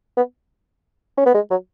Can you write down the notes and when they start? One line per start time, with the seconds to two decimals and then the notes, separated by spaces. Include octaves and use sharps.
0.17 B3
1.18 C#4
1.26 B3
1.35 G#3
1.51 F#3